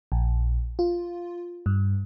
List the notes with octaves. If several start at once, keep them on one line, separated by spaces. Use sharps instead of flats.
A#1
F4
G2